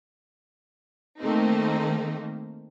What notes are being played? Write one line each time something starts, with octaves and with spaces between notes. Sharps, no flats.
D#3 A3 A#3 C4 D#4